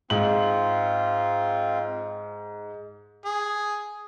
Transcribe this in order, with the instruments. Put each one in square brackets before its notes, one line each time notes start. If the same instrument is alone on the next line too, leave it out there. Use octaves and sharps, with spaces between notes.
[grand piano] G#2 F#7 [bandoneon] C4 F4
[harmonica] G#4